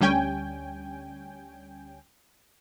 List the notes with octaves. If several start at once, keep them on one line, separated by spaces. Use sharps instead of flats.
D2 G3 C#4 G5 G#5